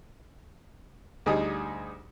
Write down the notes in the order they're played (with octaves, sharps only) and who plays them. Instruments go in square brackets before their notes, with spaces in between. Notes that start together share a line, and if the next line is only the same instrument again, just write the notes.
[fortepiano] D2 G3 D#4 G#4 D#5 D#6